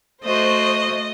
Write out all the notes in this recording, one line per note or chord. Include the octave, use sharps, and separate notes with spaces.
A3 F#4 C5 D#5